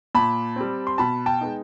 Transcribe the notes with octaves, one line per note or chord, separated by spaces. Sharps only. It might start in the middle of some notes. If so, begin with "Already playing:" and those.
A#2 A5 B5
G3 C4
C6
B2 A5 B5
G5 A5
G#3 B3 D#4